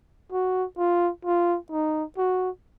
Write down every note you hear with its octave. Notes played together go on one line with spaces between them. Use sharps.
F#4
F4
F4
D#4
F#4